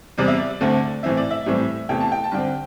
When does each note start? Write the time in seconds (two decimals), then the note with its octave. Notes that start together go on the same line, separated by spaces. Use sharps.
0.18 E2 C3 G3 C4 D5
0.28 E5
0.38 D5
0.61 D2 D3 A3 C4
1.03 A2 E3 C4 E5
1.17 D5
1.31 E5
1.46 A2 E3 G3 C4
1.89 E2 C3 E3 A3 G5
2.00 A5
2.12 G5
2.24 A5
2.31 G2 D3 C4 G5